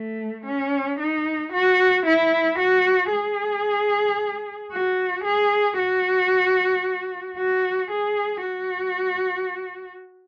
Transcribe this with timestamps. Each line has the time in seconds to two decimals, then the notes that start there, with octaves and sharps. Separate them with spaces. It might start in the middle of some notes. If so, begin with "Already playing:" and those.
Already playing: A3
0.46 C#4
0.99 D#4
1.53 F#4
2.06 E4
2.59 F#4
3.12 G#4
4.72 F#4
5.25 G#4
5.79 F#4
7.38 F#4
7.91 G#4
8.45 F#4